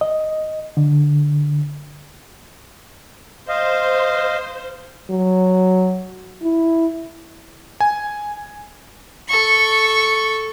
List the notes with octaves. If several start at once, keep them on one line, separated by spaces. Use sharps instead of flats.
D#5
D3
C5 D#5 F5
F#3
E4
G#5
A4 C#6